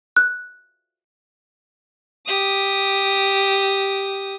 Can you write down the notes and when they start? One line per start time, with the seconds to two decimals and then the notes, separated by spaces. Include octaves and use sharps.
0.16 F#6
2.27 G4 D#6